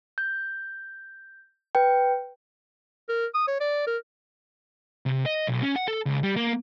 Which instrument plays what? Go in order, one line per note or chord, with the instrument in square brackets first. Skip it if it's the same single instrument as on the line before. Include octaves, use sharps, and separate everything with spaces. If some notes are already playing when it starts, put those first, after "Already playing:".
[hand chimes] G6
B4 G5
[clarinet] A#4
D#6
C#5
D5
A#4
[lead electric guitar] C3
D#5
B1
C#4
F#5
A4
C#2
G3
A#3